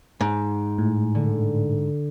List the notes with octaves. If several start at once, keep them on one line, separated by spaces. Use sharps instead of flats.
G#2
A2
D3